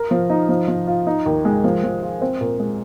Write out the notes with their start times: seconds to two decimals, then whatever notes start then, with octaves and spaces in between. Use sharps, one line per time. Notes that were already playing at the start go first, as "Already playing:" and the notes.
Already playing: A#4
0.11 F3
0.30 D#4
0.49 F3
0.68 F3
0.87 F4
1.07 D#4
1.26 D#2
1.45 G#3
1.64 F3
1.83 F3
2.02 F4
2.22 C4
2.40 A#2
2.59 G#3